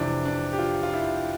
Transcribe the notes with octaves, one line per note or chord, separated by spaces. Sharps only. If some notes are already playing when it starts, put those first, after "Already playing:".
Already playing: F2 C3 E3 D4
D4
G4
F4
F4
E4